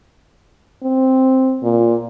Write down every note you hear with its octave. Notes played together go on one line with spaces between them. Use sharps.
C4
A#2